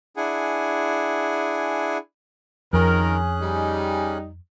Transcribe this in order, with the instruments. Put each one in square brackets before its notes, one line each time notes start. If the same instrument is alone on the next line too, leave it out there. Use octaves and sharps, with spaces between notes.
[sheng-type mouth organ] D4 E4 G#4 F#5 G#5
[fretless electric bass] F2 [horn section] D#3 A#4 [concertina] C#4 G#4 F#6
[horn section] G3 D#4